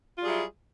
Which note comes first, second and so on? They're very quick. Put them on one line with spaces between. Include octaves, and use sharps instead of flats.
F4 G3 G#4 F#3 E4